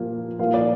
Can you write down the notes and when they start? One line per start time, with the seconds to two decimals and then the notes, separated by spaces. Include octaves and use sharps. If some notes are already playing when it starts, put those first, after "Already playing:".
Already playing: A#2 F3 A#3
0.39 A#2 F3 A#3 F5
0.54 D5